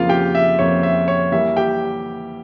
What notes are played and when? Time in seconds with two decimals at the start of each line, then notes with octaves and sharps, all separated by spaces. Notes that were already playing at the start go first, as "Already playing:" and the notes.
Already playing: F2 C#3 F3 A#3 F4 F5
0.09 G4 G5
0.35 E5
0.59 F2 C#3 F3 A#3 C#5
0.83 E5
1.08 C#5
1.32 E3 G3 A#3 E5
1.57 G4 G5